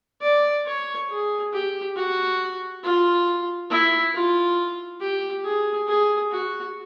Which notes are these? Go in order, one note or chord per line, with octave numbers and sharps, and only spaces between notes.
D5
C#5
G#4
G4
F#4
F4
E4
F4
G4
G#4
G#4
F#4